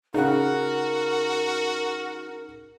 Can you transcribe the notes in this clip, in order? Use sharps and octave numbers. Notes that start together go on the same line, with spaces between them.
C#3 D#4 F#4 A#4 F#5